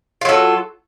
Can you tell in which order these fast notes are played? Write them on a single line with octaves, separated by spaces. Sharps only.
F4 F#3 A4